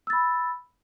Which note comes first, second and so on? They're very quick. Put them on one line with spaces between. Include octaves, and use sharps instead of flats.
E6 A6 B5